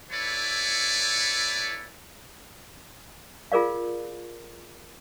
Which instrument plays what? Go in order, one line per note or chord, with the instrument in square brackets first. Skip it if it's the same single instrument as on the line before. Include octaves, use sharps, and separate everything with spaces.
[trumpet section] E4 A4 B4 C#5 D5
[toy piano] F4 G#4 A#4 D5 F5